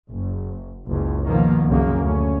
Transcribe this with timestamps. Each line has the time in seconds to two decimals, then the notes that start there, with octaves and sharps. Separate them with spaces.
0.11 F#1
0.86 F#1 C#2
1.27 B2 D#3 F3 A#3
1.67 C2 F#2 C#3 A#3
2.02 D2 C#4